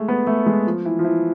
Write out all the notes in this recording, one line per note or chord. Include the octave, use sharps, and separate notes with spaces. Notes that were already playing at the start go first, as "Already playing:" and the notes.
Already playing: G#3 A3
B3
A3
G#3
F3
E3
F3
E3